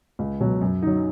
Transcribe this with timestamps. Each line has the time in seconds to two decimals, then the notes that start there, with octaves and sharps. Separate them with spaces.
0.19 C#2
0.40 B2 F#3
0.61 F#2
0.82 F#3 D#4